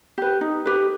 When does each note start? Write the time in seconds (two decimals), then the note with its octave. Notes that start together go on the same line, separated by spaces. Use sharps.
0.18 G4 B4
0.41 D#4
0.66 G4 B4